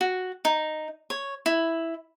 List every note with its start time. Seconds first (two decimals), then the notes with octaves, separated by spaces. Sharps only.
0.01 F#4
0.45 D#4
1.10 C#5
1.46 E4